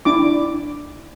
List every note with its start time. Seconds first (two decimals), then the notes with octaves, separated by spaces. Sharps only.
0.05 D4 E4 D6